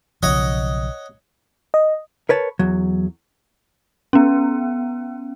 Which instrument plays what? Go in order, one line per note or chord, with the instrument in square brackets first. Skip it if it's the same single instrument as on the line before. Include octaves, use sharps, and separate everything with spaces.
[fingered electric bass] B1 C#3 F3 [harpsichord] C#5 D#5 F#5
[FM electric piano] D#5
[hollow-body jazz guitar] A#4 B4 C#5 A5
E2 F#3
[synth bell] B3 C#4